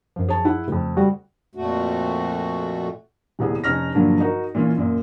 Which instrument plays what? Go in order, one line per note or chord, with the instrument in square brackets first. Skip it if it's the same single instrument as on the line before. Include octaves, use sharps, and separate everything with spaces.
[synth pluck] F#2 F3
[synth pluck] G#4 [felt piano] C#5 A5
[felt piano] E4 F#5
[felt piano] F2 A3 [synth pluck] C#3
[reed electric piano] G3 F#4
[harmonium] F2 A#2 A3 F#4
[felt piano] D#1 C2 B3 G#4
F1 C#4 D#4 F6 A#6
G2 A#2 D3 F3 F#3
D#4 F#4 A#4
A#2 E3 C#4 F4
F#2 A#2